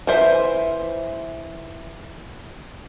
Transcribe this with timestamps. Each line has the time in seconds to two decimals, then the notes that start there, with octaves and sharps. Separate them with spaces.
0.07 E3 C5 E5